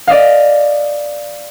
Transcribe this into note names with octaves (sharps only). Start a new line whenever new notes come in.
D5 D#5 F5